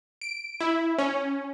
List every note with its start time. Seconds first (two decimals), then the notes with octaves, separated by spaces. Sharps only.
0.21 D7
0.60 E4
0.98 C#4